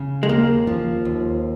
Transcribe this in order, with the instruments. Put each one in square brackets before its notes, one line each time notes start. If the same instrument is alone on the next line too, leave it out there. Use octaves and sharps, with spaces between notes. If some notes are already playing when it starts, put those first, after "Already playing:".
Already playing: [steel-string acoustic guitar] C#3
[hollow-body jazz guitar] G#3
[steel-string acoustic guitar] D#2 [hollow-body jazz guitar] A#3
[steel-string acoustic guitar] F3
D#2